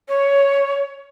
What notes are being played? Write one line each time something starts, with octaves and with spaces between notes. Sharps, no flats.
C#5